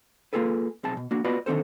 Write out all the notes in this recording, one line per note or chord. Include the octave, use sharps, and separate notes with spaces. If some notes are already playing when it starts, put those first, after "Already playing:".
A#3 D#4 F4 G#4 A4 B4
B1 C3 G#4 A5
B2
A#3 D4 F#4
B3 F4 F#4 B4 D5 D#5
D3 D#3 C4 A4 C5